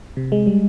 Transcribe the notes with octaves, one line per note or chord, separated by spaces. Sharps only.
C3
G#3
G3